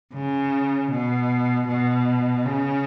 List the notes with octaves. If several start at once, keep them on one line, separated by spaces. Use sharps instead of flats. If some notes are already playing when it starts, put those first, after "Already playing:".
C#3
B2
B2
C#3